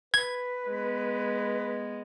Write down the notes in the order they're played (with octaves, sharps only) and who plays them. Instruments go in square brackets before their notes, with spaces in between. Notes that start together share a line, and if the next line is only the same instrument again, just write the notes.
[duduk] B4 [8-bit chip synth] G#6
[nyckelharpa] G#3 B3